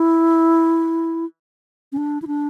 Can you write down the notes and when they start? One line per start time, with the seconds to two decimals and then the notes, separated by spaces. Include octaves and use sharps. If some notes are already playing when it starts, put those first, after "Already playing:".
Already playing: E4
1.92 C#4
1.97 D4
2.22 E4
2.27 D4